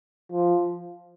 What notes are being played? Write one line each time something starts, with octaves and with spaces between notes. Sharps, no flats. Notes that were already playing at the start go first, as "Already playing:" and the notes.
F3